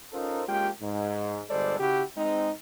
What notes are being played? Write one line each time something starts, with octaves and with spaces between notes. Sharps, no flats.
C#4 D#4 F4 A4 A#4 C5
G#3 A#3 C#4 F4 G4 G5
G#2
G1 G2 G#3 A4 C5 D5
C#3 E4 F#4 G4
G#3 C4 D#4